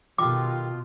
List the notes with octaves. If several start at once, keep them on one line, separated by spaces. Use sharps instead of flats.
B2 D#3 G3 F4 A4 D6